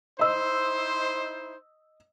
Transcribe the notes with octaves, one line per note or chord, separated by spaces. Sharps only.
D#4 E4 C5 D#5 E6